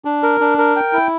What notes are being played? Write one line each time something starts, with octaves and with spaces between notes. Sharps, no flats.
D4
A#4
D4
A#4
G5
E4